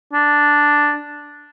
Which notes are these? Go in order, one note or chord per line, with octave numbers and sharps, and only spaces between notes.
D4